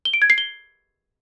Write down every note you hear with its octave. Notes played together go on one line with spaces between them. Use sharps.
G7
D7
G#6
C7
G7